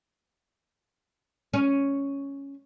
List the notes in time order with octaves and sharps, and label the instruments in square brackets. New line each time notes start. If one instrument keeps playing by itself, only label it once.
[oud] C#4